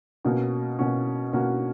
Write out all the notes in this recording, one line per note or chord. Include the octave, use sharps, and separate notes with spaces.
B2 A#3 C#4 F#4
B2 A#3 C#4 F#4
B2 A#3 C#4 F#4